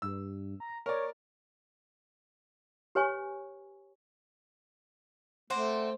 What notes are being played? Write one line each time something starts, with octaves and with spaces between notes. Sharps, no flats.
G2 E6
A#5
A#4 C#5 D5
G4 B4 C#5 G#5 C#6
A3 C4 C5 D5 F#5